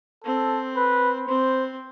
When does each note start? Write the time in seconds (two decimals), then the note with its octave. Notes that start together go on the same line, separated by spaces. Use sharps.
0.24 C4 A4
0.77 B4
1.28 C4 C5